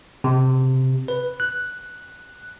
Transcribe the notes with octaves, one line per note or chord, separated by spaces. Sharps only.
C3
B4
F#6